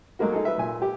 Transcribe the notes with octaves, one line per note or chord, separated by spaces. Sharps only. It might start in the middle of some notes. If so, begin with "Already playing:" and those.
F#3 G#3 A#3 F#4
D#4 G#4 A4
B4 E5
A#2 G#5
G4